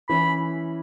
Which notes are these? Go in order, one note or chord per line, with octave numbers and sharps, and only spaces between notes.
E3 C#4 E4 B5